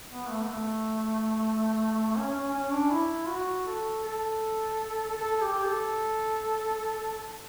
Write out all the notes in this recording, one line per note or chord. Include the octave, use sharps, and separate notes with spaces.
B3
A3
B3
A3
C#4
C#4
C#4
D4
E4
F#4
A4
A4
A4
G4
A4